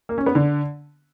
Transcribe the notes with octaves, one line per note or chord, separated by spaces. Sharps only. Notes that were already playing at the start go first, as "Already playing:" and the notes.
A#3
C#4
B3
D3